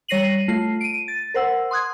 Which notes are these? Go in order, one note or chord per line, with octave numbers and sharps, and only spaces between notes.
G3 C#5 A#6 C7 D#7 F#7
A3 F4 C7
D7 D#7
A6
A#4 C5 F#5 E6
C6 D#6 F#6 G#6